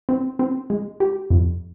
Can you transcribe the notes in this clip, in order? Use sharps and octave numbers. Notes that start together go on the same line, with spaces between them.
C4
C4
G#3
G4
F2